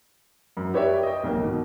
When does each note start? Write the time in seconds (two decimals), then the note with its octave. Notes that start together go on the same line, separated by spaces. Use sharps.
0.57 F#2
0.74 G4 B4 C#5 D5 E5 G5
1.03 D#5 G5
1.24 B1 A#3
1.38 B2 D#3